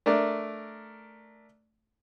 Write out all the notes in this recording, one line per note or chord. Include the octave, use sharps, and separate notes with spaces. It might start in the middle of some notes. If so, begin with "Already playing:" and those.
A3 D4 A#4 D5